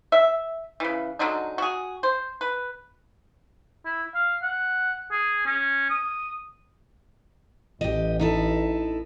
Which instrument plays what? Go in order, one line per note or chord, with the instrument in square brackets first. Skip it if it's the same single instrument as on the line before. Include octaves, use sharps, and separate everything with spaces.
[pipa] E5
C#3 E3
D3 F#3 G#3 D#4
F#4 G#4
C5
B4
[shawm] E4
F5
F#5
G#4
C#4
D#6
[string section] A1 [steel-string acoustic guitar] G4 D#5
[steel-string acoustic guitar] D#4 E4 A4